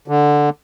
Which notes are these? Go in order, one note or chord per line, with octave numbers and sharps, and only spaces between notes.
D3